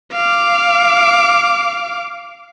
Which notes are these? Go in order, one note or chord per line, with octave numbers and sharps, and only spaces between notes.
F5 D6